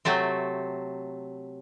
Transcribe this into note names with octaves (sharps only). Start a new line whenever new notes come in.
C3 F#3 A3 C4